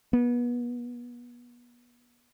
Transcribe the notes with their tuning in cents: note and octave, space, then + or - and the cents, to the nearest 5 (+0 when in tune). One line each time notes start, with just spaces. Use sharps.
B3 -30